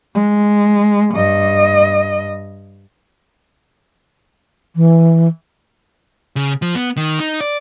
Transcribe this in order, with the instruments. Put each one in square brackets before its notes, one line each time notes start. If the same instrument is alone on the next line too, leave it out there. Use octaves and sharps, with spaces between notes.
[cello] G#3
G2 D#5
[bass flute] E3
[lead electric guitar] C#3
F3
B3
D#3
D#4
D5